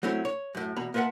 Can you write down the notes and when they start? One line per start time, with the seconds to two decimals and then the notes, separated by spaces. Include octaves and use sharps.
0.03 F#3 A3 C4 C#4 E4
0.25 C#5
0.55 F#2 A2
0.76 E2 B2 A#5 B5
0.94 A#3 F4 B4 E5 F#5 A5